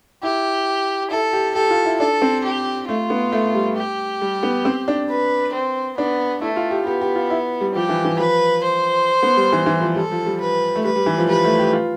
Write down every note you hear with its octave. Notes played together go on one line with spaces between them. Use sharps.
E4 G4
E4 A4
G4
G4 A4
F4
E4
D4 A4
C4
G4
A3 F4
B3
A3
G3
G4
G3
B3
C4
D4
B4
C4
B3 D4
A3 E4
F4
G4
B3 G4
G4
F4
E4
G3
F3 G4
E3
E3
F3 B4
C5
B3
G3
E3
E3
F3
G3 A4
F3
G3
B4
A3
G3 B4
G3
E3
F3
G3 B4
A3
G4
F4